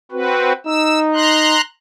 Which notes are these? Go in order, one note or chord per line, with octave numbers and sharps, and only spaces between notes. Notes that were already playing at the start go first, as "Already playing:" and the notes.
C4 F#4 B4
D#4 E6
A#5 C6 F#6